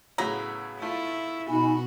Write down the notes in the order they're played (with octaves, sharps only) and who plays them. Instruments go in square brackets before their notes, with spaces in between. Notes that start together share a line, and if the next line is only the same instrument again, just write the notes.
[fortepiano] A2 C#3 F#3 [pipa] B3 A#5
[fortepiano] A3 F4 [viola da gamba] E4
[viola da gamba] B2 F#4 [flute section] D#4 G#5 B5